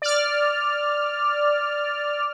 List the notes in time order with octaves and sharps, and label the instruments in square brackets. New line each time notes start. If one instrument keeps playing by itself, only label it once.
[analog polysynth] D5 F6